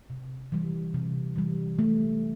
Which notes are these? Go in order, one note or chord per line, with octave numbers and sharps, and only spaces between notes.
C3
E3 G3
C3
E3 G3
A3